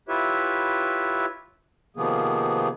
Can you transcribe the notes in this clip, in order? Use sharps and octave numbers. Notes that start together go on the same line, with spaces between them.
E4 F4 G4 B4 C#5 E5
C3 D#3 F3 A#3 B3 G#4